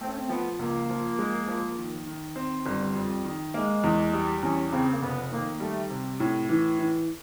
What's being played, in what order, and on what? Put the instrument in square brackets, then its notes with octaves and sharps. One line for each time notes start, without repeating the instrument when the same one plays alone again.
[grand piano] A3 [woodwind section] C4
[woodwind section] C#4
C4
[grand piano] F3 [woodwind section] B3
[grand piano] C#2 [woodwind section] A#3
[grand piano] F3
G#3
F3
D#3
D#3
C4
[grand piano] G1 [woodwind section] G3
[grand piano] F2
D#3
[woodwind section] G#3 [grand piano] A#3
[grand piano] E2
G3
[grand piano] E2 [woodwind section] C#4
[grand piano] C#3 [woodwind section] C4
[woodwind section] A#3
[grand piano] F1 [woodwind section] B3
[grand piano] D#3 [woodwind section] A#3
[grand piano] G3 [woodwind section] A3
[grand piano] C3
A2
E3
E3